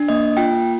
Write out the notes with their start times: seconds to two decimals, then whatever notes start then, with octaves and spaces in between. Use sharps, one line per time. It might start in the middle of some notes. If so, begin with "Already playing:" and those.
Already playing: D4
0.08 A#3 D#5
0.37 F4 G5